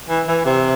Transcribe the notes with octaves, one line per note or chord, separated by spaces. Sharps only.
E3
E3
C3